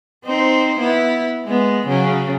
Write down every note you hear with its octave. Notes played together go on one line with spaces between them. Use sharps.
C4 D#4 C5
B3 E4
G#3 B3
C#3 F#3